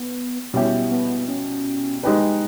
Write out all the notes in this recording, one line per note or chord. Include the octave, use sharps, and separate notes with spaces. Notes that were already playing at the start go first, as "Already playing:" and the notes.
Already playing: B3
B2 G3 B3 C#4 E4 G4
B3
C#4
G#3 D#4 G4 B4